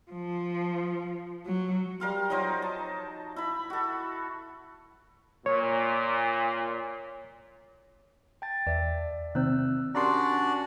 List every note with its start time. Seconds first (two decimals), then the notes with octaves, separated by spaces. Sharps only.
0.11 F3
1.46 F#3
2.00 G3 A#4 F5 C6
2.30 F3 F#3 D#4 C5
2.62 A5
3.36 E4 B5
3.70 F#4 A4
5.46 A#2 C#5
8.42 G5 A5 A6
8.67 E2 D5 E5
9.35 C3 D#3 C4 E6 F#6
9.95 C#4 D4 F#4 G4 A#4 D5 A#5 C6